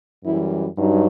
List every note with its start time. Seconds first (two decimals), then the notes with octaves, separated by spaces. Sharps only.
0.23 F#2 E3 G3 E4
0.78 G2 F#3 D#4